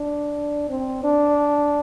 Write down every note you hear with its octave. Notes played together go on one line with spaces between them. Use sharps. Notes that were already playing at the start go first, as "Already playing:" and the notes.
Already playing: D4
C4
D4